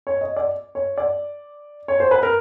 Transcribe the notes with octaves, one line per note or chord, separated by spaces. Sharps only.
C#5
D#5
D5
C#5
D5
C#5
C5
B4
A#4